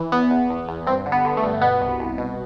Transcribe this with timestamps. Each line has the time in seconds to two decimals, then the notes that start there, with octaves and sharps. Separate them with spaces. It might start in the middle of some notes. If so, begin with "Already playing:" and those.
Already playing: E3
0.12 E2 B3
0.31 E2
0.50 E2
0.68 E2
0.87 G2 C4
1.06 D3
1.12 B3
1.25 D3
1.37 A3
1.43 G2
1.62 B2 B3
1.81 C2
2.00 C2
2.18 B2